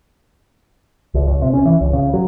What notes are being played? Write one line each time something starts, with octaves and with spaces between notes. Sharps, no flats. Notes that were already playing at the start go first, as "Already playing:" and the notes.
C#2
C#2
C3
C#4
E3
C#2
C#3
F#3